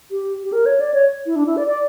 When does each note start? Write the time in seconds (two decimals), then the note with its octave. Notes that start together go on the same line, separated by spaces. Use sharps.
0.11 G4
0.44 G4
0.52 A#4
0.66 C#5
0.80 D5
0.94 C#5
1.26 E4
1.36 D4
1.46 E4
1.57 D5
1.67 D5